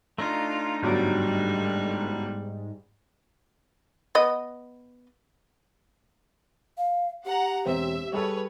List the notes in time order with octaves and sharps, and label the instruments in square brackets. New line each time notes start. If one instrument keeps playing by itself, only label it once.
[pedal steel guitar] A3 D4 D#4 [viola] F4 [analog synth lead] A#5
[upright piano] G1 F#3 [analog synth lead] G#2 [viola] G3
[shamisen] B3 D#5
[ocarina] F5
[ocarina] G4 [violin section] F#5 A#5
[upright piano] E1 C4 [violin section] E5
[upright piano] G3 G#4 A4 [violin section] B4 C#5